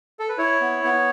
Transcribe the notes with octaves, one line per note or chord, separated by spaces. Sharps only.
A4
B4
E4 C#5
B3
B3